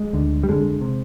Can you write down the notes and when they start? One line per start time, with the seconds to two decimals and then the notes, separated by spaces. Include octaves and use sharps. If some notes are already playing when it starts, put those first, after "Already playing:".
Already playing: G#3
0.13 D2 D3
0.43 G3
0.48 F2 D3 G#3
0.81 C3